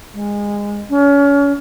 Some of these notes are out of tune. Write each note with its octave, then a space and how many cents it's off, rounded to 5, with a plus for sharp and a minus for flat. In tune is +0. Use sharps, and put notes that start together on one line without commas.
G#3 -20
C#4 +30